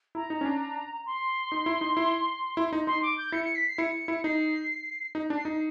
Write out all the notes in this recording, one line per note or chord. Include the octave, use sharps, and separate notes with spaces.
E4 A#5
D#4
C#4
D4
C6
D#4
E4
D#4
E4
E4
D#4
D#4 C6
D6
G6
E4 C#7
C#7
B6
C7
E4 C#7
E4
D#4 C7
D#4
D4
C7
D#4